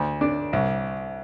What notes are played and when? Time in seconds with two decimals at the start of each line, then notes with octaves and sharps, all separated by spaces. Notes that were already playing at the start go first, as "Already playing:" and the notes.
Already playing: D2
0.21 D4
0.53 C2